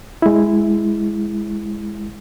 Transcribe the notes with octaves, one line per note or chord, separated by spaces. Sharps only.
G#3 E4